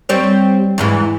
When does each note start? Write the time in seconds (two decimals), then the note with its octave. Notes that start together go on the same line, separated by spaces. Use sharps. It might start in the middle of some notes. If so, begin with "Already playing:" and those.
0.09 G3 C4 C#5
0.78 E2 G#2 E3